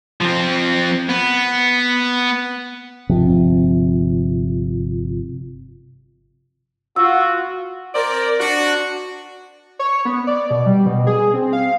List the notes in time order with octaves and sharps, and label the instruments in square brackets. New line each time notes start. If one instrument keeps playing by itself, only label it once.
[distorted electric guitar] F3 C4
B3
[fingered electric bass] G1 C3 F3 C4
[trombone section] F4 F#4 [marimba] F#5 E6
[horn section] C4 A#4 C5 D5
D4 F#4
[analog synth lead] C#5
B3
D5
B2
G3
B2
G#4
C4
F5